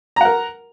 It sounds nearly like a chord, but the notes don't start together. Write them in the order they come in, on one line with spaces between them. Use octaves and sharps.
A#5 F#5 A#4